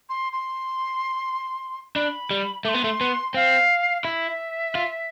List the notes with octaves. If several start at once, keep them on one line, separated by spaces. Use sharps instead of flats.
C6
C6
D4 B5
G3
A3 C6 D6
B3
A3
B3
C4 F5
E4 E5
F4